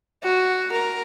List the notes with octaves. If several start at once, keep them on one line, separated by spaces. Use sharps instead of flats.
F#4
A#4